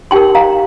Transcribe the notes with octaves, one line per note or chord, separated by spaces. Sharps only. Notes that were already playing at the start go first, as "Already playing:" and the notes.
D#4 G4 A#4 G5 C6
F5 A#5